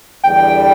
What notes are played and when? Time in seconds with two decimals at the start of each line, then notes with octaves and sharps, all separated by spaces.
0.23 E2 D3 G3 G5